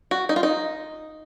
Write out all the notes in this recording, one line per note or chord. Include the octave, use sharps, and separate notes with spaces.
F#4
D#4
F4
D#4